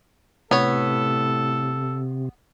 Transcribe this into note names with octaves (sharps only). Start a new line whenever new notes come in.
A2 C3 B3 A4 C#5